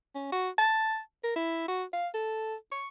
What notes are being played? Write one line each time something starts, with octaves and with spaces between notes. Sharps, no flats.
C#4
F#4
A5
A#4
E4
F#4
F5
A4
C#6